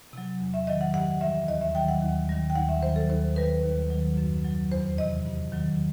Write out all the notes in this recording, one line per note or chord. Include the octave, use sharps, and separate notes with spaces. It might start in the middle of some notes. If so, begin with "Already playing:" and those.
C3 F#3
E2
E5
D#3 F#3 D#5
F#5
G2 F#5
E3 G3 E5
D#2 D#5
E5
D#3 F#3 G5
F#5
D#2
D#3 G3
G5
D#2 F#5
E5
D#3 F#3 C5
A4
D#2 C5
D#3 G3 B4
D#2
D#3 F#3
F#2
F#3
E2 C5
C3 E3 D#5
G2
D#3 F#3